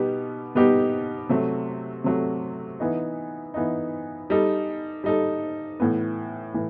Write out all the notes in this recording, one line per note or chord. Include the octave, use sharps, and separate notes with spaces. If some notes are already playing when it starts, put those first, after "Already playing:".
Already playing: B2 G3 B3 D#4 G4
B2 G3 B3 D#4 G4
C3 F#3 A3
C3 F#3 A3
E3 B3 D#4
E3 B3 D#4
G3 D#4 A4
G3 D#4 A4
A2 E3 B3
A2 E3